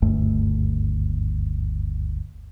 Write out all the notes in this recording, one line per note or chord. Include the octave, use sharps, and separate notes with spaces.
F#1 D2 G2 A3